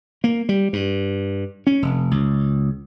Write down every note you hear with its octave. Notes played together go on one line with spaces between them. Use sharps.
A#3
G3
G2
C#4
F1
C#2